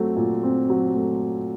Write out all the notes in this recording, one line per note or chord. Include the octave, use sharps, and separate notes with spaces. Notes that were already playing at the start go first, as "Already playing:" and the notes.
Already playing: F#3 A3 C4
A#2
C4
F#3
A3